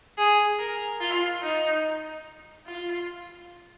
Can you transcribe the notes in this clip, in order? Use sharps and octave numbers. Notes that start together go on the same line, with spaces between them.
G#4
A#4
F4
D#4
F4